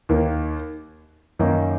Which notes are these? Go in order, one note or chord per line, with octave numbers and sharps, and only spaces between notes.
D#2 D#3 A#3
F#2 D#3 A#3 D#4